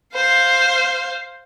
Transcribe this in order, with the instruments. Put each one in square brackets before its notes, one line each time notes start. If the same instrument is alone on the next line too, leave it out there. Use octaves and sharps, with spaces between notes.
[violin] C5 F5